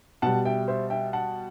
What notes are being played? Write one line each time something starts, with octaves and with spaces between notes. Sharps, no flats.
B2 G3 F#5 A5
E5 G5
C5 E5
E5 G5
F#5 A5